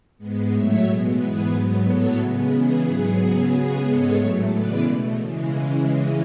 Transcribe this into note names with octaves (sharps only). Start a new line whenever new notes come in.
G#2 G#3 B3
A2 F#3 A3 C#5 E5
B2 G#3 B3
G#2 E3 B3 G#4 B4
G#2 F#3 B3
A2 F#3 B3 A4 C#5
C#3 G#3 B3
C#3 E3 B3 G#4 B4
G#2 F#3 B3 G#4
C#3 F#3 B3 G#4
C#3 G#3 B3 G#4 B4
G#2 G#3 B3 A4 C#5
A2 F#3 A3 C#5 E5
C#3 E3 G#3 B3 B4 D5
B2 A3
C#3 E3 G#3